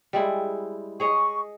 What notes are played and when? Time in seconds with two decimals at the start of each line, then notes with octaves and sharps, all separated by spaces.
0.13 G3 G#3 E4
1.00 G#4 C#5 D#5 C#6